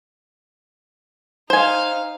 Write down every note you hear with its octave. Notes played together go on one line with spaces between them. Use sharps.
D#4 C5 F5 G#5